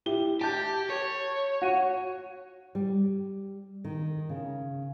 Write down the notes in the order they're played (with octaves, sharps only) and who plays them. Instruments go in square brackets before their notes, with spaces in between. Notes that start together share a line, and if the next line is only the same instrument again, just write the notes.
[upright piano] E4 G4 G7
[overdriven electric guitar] G4 [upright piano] A5 G6
[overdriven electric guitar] C#5
[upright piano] F#4 D#7
[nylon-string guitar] G3
D#3
C#3